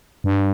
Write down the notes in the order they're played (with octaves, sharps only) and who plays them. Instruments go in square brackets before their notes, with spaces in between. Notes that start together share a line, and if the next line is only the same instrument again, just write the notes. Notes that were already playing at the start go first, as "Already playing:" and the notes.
[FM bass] G2